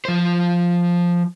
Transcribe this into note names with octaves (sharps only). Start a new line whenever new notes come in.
F3 C5